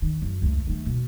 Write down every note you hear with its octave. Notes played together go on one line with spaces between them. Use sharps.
D#3
F#2
C#2 A3
D#3 A3
B2